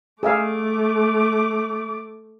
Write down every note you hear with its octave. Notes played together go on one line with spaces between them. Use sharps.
A3 G#4 E5 F5 D6